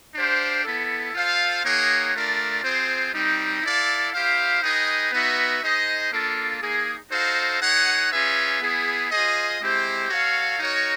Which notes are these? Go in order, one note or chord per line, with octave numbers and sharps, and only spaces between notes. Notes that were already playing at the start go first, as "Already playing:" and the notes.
D4 G4 C5 F5
B3 E4 A4
F4 A4 C5 F5
A#3 D#4 G#4 C#5 F#5
A3 D4 F4 A#4 D5
C4 F4 G#4 C5
G3 C4 D#4
E4 A4 D5 F5
E4 G4 C5 F5
D#4 G#4 B4 D#5 G5
B3 D#4 F#4 B4 E5
D#4 G#4 C5 D#5
A#3 D4 F4 A4
A#3 D#4 G#4
D#4 F#4 A4 C5 F5
D#4 G#4 C#5 F#5
C#4 F4 G#4 B4 E5
B3 E4 G#4
F4 G#4 C5 D#5
G#3 C4 E4 G4 C5
F#4 A4 C#5 F5
D#4 F#4 A#4 C#5